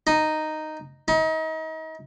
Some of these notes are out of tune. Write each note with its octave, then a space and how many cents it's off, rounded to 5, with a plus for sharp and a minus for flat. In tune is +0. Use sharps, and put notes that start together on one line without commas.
D#4 -5
D#4 +35